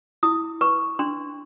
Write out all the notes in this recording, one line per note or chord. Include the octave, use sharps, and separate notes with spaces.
E4 D#6
B4 C#6
D4 C6